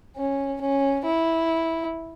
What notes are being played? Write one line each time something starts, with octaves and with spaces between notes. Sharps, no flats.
C#4
C#4
E4